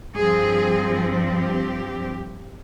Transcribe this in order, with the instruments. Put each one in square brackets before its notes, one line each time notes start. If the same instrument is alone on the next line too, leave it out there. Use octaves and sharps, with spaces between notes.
[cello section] G2 F3 C4 G#4
G4